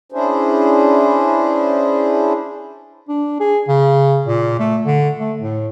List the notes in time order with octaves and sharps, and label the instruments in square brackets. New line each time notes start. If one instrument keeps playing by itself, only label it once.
[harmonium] C#4 D4 E4 G#4 C5
[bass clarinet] D4
G#4
C#3
A#2
A3
D3
A3
A2